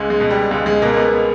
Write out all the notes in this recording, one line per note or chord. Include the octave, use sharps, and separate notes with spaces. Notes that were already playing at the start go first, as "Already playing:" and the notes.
Already playing: C#2 G#3
G#3
B2
G3
C#2 G#3
G#3
B2 A#3
B3